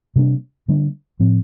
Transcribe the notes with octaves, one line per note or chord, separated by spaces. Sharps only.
C3 G3 A#3 D4
D3 G3 A#3 D4
A2 F3 C4